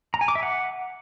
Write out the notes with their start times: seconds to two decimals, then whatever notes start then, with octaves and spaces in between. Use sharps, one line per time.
0.14 A#5
0.21 G#5
0.28 D6
0.35 E5
0.43 F#5